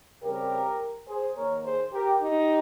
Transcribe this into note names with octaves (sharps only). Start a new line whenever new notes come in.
C#3 G3 C4 G4 A#4
G#4 C5
D#3 A#3 A#4 C#5
G#4 C5
G4 A#4
D#4 G4